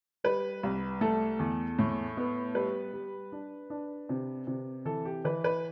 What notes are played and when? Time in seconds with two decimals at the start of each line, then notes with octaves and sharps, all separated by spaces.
0.24 G3 B4
0.63 C2
1.01 A3 A4
1.39 E2
1.79 A2
2.17 B3
2.55 G3 B4
2.93 G3
3.32 D4
3.70 D4
4.09 C3
4.47 C3
4.85 E3 A4
5.05 G4
5.25 E3 B4
5.44 B4